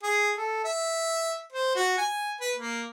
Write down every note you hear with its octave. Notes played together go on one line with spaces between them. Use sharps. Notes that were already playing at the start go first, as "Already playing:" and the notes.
G#4
A4
E5
C5
F#4
G#5
B4
A#3